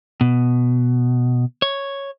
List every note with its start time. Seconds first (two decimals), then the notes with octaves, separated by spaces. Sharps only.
0.21 B2
1.62 C#5